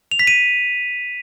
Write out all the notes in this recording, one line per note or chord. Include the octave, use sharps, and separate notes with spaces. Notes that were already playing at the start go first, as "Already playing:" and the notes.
F7
B6
D#7